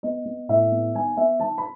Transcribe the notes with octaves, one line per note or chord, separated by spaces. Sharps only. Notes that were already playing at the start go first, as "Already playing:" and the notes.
B3 D#5
B3
A2 E5
B3
D#3 G#5
B3 E5
D#3 A5
B5